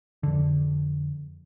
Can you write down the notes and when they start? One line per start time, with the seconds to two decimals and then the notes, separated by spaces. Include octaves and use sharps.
0.23 F2 D3